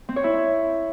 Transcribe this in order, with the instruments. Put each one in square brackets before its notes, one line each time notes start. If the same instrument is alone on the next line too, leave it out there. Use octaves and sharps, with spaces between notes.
[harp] C4
C#5
E4